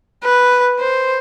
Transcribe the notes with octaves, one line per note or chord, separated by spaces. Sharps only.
B4
C5